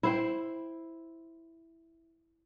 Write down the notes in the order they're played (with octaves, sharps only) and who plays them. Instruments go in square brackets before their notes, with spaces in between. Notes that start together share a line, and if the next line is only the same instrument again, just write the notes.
[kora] E4 C5 G5